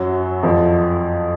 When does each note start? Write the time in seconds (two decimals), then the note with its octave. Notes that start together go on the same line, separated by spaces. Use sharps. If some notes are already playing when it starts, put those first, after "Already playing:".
Already playing: F#2 F#3
0.43 F2 F3